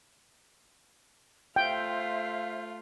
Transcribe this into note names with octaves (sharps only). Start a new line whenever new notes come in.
A3 F4 C5 E5 F5 G5